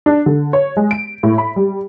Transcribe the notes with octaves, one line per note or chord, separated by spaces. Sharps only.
D4
D3
C#5
G#3
D7
A2
B5
G3